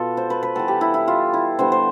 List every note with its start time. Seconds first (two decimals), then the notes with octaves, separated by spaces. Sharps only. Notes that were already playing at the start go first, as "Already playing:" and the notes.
Already playing: B2 B3 F4 A4
0.17 C5
0.30 B4
0.43 B4
0.55 E3 G3 B3 A4
0.68 G4
0.81 E4
0.94 E4
1.08 F4
1.34 E4
1.59 D3 G3 B3 C5
1.72 C5